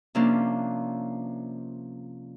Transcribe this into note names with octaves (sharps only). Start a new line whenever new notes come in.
C3 F3 A#3 C#4 D4